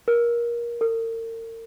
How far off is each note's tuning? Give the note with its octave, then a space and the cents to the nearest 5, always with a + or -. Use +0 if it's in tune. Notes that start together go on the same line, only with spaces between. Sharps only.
A#4 +20
A#4 -40